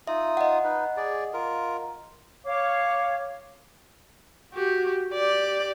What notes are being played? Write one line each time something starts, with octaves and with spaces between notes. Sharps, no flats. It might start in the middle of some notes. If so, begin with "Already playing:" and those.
D#4 F4 E5 D#6
D#5 F#5
D#4 B4
G#4 D5
F4 A#4
C#5 F5 D6
F#4 G4
G4 D5